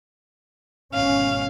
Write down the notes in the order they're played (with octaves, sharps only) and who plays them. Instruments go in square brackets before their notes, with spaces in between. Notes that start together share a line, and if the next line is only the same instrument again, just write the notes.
[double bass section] G#1 B2 C#4 [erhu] F5